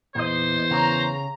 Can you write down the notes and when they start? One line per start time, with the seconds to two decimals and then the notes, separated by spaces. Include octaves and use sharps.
0.15 E2 A#2 C5 D#5
0.71 C#3 G#4 C#5 A#5